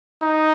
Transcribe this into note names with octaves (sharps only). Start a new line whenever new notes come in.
D#4